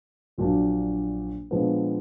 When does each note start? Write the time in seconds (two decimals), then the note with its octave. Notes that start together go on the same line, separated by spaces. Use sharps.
0.38 A#1 A#2 F#3 D4
1.51 A#2 F3 G#3 B3 D4